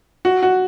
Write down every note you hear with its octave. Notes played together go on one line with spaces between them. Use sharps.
F#4
F#4